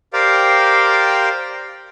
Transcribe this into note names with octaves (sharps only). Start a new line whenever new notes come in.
G4 A#4 C5 D5 F5 G5